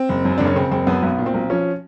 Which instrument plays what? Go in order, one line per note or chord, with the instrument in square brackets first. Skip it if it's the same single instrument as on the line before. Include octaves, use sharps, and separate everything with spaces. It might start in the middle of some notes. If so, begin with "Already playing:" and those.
Already playing: [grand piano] C4
F#1
F#2
F#1 D4
C#4
C#3 C4
F#1 C4
F#2 B3
B1 B3
A#2
C4
B1
F3 C#4